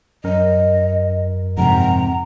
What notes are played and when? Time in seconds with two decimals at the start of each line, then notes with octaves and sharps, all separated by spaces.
0.24 F#2 A#4 D#5
1.58 F2 G#2 C3 F#5 A#5